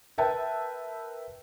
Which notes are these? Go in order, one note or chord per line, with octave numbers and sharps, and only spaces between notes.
A#4 B4 E5 G5 A5